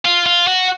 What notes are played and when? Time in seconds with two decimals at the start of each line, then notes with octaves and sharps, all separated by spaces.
0.05 F4
0.26 F4
0.48 F#4